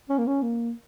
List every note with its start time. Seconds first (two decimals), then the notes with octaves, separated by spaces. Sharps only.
0.09 C#4
0.18 A#3
0.27 C#4
0.42 A#3